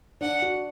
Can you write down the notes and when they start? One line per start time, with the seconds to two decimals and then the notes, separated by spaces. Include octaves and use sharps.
0.21 D4 F#5
0.42 F#4